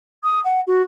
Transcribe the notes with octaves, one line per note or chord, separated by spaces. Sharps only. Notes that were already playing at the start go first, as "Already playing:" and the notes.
D#6
F#5
F#4